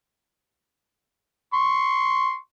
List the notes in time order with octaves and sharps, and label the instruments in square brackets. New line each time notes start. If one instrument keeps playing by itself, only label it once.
[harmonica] C6 C#6